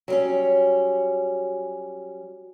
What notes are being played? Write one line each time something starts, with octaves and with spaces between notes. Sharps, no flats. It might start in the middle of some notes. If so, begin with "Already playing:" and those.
F#3 G3 C#4